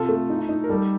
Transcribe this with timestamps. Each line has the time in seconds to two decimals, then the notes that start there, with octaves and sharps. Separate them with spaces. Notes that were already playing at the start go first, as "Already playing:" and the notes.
Already playing: C3 F4 A4
0.09 A3
0.30 D#4
0.49 D#4
0.64 A#4
0.69 G3 A4